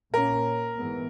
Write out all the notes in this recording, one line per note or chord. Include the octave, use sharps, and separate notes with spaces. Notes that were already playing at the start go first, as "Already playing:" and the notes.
A#2 A#3 C#4 A#4
G#2 E3 G#3 B3